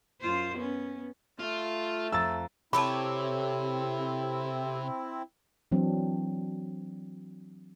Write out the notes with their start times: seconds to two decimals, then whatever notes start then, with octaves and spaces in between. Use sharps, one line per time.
0.21 F#2 F4 C5
0.56 B3 C#4
1.39 A3 F4
2.12 F2 A#5 E6 A6
2.73 C3 C4 E4 G4 A4 C#5 A5 B5
5.72 E3 F#3 C4 D4